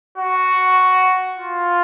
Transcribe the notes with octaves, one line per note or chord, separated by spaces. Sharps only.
F#4
F4